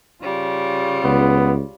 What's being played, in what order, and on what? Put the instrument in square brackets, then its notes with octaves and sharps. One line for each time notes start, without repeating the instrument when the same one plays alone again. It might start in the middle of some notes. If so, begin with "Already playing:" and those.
[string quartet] C#3 G3 F4
[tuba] C#2 [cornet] B3